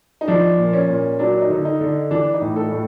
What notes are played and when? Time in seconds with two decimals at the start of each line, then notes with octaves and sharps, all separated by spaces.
0.21 D#4
0.27 F3 D4
0.58 A#2
0.73 C#4
0.89 A#2
1.19 F#3 D4
1.42 D#4
1.50 D3
1.65 D#4
1.80 D3
2.11 E3 D4
2.34 D#4
2.41 A2
2.56 A4
2.71 A2